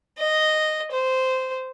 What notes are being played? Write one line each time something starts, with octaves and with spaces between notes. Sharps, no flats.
D#5
C5